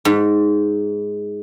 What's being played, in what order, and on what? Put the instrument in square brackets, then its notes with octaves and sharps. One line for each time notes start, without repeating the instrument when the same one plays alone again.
[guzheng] G#2